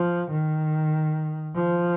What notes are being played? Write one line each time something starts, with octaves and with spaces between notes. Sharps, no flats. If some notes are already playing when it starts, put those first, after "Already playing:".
Already playing: F3
D#3
F3